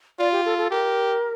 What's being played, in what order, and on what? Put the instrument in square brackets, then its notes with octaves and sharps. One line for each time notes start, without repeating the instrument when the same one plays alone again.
[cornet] F4 [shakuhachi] D5
[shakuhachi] G4
A4
A4
[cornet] G4 [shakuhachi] A#4